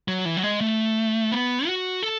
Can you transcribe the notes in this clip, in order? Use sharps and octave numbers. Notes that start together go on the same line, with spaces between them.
F#3
E3
F#3
G#3
A3
B3
F#4
A4